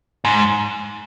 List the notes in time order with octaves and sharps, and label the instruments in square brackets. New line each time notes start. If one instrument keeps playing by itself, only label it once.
[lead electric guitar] G#2